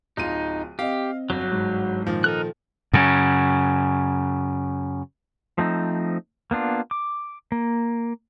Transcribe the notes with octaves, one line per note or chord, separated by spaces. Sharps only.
D1 D#4 F4 D#7
C4 G4 D#5 F5
G1 F#3 F#4
G#2
A#2 D#3 F3
D#4 A4 A#4 F#6
F#2 C#3
F3 A3 C4 D#4
A#3 B3 D4 F4
D6
A#3